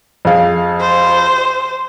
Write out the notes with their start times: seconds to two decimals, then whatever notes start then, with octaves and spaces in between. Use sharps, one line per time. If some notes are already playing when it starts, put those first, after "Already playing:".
0.25 F2 G#4 F5
0.80 C5